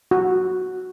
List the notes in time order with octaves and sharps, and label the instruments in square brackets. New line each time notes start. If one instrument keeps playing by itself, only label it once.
[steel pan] F#4